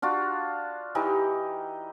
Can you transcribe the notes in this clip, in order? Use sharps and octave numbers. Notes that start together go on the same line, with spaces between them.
D4 F4 F#4
E3 D#4 G4